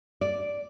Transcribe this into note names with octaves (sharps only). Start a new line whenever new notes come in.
D5